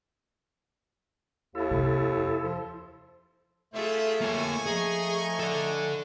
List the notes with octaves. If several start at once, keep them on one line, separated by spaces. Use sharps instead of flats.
D#2 E4 A4
F2 C3
F3
A3 E4 F4 G#4 A4 C5 E5
A#3 C#5 G#5 C#6
F3 A3 G#4 D#5 A#5
A4 D5